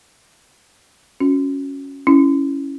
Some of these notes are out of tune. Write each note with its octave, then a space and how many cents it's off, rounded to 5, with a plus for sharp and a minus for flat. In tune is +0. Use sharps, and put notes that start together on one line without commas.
C#4 +0 F#4 -20
C#4 +0 E4 +0